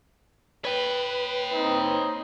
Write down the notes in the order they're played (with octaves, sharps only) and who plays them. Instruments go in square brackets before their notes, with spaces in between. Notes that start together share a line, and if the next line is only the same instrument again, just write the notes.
[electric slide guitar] B4 [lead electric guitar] C#5 G5
[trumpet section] C4 D#4